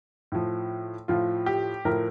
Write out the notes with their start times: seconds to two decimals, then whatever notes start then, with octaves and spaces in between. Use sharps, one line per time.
0.32 A2 F3
1.08 A2 F3 F4
1.46 G4
1.85 A2 F3 A#4